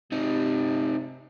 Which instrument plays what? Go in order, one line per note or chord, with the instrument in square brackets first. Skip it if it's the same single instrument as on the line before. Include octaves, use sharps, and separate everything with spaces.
[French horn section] C3 [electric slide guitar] C4 D#4